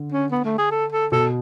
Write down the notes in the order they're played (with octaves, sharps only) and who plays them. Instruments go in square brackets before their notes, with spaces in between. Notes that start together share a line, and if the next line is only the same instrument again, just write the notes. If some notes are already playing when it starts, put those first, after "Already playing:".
Already playing: [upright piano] D3
[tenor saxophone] C#4
B3
A3
G#4
A4
A4
[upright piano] B2 [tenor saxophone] A4